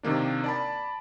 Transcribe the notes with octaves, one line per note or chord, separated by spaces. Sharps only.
C3 D#3 A#3 D4
D5 A5 B5